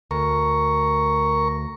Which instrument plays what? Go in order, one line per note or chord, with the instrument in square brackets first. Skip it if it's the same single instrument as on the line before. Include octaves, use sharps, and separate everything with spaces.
[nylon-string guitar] D2 [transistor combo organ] A#4 A#5 C#6